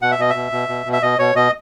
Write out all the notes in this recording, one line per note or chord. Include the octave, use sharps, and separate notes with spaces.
B2 F#5
E5
B2 D#5
E5
B2
B2
B2
B2
E5
B2 D#5
B2 C#5
B2 D#5